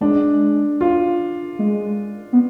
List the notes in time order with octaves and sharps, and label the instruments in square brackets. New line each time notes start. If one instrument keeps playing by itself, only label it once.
[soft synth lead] G#3 [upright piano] D4
[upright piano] F4
[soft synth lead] G#3
B3